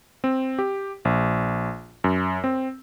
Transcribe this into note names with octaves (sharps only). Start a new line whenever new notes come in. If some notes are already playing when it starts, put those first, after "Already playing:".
C4
G4
A#1
F#2
C4